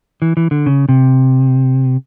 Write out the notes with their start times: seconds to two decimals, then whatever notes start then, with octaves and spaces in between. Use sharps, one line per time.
0.22 E3
0.37 E3
0.51 D3
0.66 C#3
0.89 C3